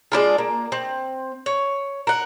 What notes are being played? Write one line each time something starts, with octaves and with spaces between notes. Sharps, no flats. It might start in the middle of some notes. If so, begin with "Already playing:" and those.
G#3 D4 E4 F4
A#3
C4
C#5
A#4 F#5